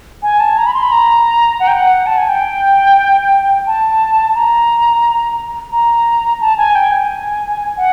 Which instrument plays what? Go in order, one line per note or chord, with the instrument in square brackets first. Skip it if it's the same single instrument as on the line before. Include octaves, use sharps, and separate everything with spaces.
[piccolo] G#5
A5
A#5
B5
C6
B5
A#5
F#5
G5
F#5
A5
G#5
G5
A5
A#5
A#5
A5
G#5
G5
G#5
F#5